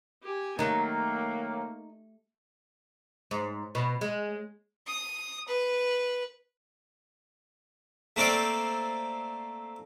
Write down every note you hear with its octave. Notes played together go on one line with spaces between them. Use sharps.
G4 G#5
D#3 F#3 A3 A#3 D#4
G#2
B2
G#3
D#6
B4
A3 A#3 C4 D5 G5